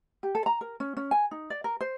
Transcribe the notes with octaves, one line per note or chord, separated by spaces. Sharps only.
G4
A4
A#5
A#4
C#4
C#4
G#5
D#4
D5
A#4
C5